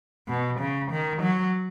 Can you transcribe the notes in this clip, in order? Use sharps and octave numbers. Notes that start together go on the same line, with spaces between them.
B2
C#3
D#3
F#3